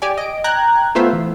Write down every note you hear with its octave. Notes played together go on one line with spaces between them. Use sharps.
G4 D5 G#5
D#5 D7
G5 A#5 F#6 G#6
A3 B3 F4 C5 E5
E3